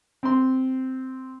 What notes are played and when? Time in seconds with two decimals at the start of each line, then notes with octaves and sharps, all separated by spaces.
0.23 C4 C6